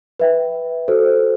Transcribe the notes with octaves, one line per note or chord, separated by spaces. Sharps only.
B4 E5 G5
F#4 A4 C5